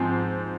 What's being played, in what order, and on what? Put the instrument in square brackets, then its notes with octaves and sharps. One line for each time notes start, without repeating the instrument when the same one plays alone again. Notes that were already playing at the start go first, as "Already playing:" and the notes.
Already playing: [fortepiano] G#2 F3 C4